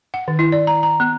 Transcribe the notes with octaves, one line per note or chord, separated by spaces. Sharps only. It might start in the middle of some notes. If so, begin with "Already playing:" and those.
F#5
D#3
E4
D5
A#5
A#5
B3